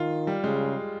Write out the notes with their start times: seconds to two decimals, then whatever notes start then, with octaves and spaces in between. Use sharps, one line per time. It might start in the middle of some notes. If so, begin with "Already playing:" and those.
Already playing: D#3 F4
0.27 G3
0.44 C#3 G#3